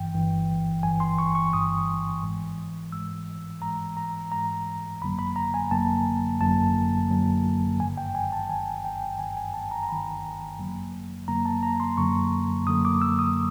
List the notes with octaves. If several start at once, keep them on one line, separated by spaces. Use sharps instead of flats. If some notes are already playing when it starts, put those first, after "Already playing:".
Already playing: G1 G2 E3 G5
G1 G2 E3
G1 G2 E3 G#5
C6
C#6
C#6
G1 G2 E3 D#6
G#2 E3 G#3
G#2 E3 G#3 E6
G#2 E3 G#3 A#5
A#5
G#2 E3 G#3 A#5
G#1 F#2 D3 F#3 A#3 B5
B5
A#5
G#5
G#1 F#2 D3 F#3 A#3 A5
G#1 F#2 D3 F#3 A#3 A5
G#1 F#2 D3 F#3 A#3
G1 G2 D#3 G#5
G5
G#5
A5
G1 G2 D#3 G#5
G5
G1 G2 D#3 G#5
G#5
A5
A#5
A#5
G1 G2 D#3 B5
F#2 D3 F#3 A#3
F#2 D3 F#3 A#3 A#5
A5
A#5
C6
F#2 D3 F#3 A#3 C#6
F#2 D3 F#3 A#3 D#6
D6
E6
D#6